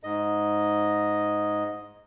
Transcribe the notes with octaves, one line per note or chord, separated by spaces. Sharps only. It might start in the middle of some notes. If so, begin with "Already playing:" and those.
G#2 D#5